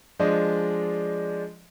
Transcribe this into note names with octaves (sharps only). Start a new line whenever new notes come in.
F3 G#3 D4 D5 D#5